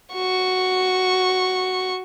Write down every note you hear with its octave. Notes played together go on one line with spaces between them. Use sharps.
F#4 C#6